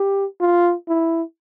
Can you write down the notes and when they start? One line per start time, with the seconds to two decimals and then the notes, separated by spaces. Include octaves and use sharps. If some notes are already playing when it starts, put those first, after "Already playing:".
Already playing: G4
0.41 F4
0.89 E4